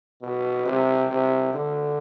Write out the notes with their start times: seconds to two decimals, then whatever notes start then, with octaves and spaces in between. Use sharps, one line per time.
0.22 B2
0.65 C3
1.10 C3
1.54 D3